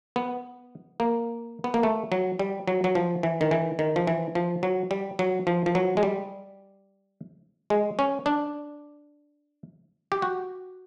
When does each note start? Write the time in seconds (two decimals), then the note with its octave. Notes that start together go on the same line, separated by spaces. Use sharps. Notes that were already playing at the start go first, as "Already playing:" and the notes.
0.16 B3
1.00 A#3
1.64 B3
1.74 A#3
1.83 A3
2.12 F#3
2.39 G3
2.68 F#3
2.84 F#3
2.95 F3
3.23 E3
3.41 D#3
3.51 E3
3.79 D#3
3.96 F3
4.07 E3
4.35 F3
4.63 F#3
4.91 G3
5.19 F#3
5.47 F3
5.66 F3
5.75 F#3
5.97 G#3
6.03 G3
7.70 G#3
7.99 C#4
8.26 D4
10.12 G4
10.22 F#4